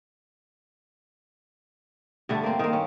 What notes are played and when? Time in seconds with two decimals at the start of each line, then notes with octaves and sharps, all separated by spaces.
2.29 G2 D3 A3
2.43 A#3 C4
2.59 D#3 A#3
2.73 C#4